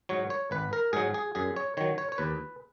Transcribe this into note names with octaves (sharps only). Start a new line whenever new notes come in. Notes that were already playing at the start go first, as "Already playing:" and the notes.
G#2 F#3 C#5
C#5
G#1 B4
A#4
G#2 F#3 G#4
G#4
F#2 G#4
C#5
D#3 F#3 C#5
C#5
C#5
D#2 B4